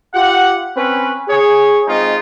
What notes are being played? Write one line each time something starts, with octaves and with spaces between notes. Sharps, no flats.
F4 G4 F#5
C4 C#4 B4
G#4 C#5
G#3 C4 D#4 F4